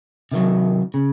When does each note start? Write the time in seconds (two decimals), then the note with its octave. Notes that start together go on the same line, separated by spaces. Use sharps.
0.32 C3 D#3 F#3
0.94 C#3